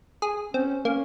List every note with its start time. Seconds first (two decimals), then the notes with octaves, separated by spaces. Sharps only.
0.22 G#4
0.54 C4 C#4
0.85 A#3 C#4